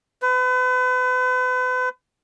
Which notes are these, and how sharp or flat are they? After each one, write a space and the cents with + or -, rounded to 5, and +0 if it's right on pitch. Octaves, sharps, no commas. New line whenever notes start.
B4 +40